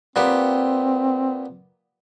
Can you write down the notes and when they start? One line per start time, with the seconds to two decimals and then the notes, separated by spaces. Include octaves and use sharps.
0.16 A#2 B3 C4 G4